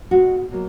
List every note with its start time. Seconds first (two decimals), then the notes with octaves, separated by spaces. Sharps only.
0.11 B2 G#3 F#4
0.50 B2 F#3 A#3